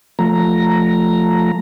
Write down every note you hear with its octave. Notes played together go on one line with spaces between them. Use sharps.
F3 A3 A#5